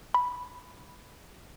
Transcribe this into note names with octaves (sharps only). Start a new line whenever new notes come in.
B5